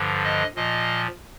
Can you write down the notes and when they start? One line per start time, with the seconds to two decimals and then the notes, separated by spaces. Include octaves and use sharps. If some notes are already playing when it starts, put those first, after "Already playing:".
Already playing: G2 D3 F3
0.24 D#5
0.56 A#2 F3 D#5